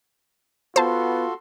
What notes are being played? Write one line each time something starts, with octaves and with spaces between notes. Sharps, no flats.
B3 F4 F#4 A4 C5 A5 C6